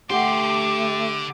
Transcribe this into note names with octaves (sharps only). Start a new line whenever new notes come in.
D3 A3 G4 C6 D6